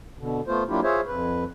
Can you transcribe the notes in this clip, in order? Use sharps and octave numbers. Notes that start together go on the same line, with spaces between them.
B2 D3
A3 B3 F4 C5
F#3 A#3 D4 E4 F4 G4
F4 G#4 C5 C#5 E5
F2 B4